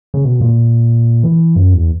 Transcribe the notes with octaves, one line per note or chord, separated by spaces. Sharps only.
C#3
B2
A#2
E3
F#2
E2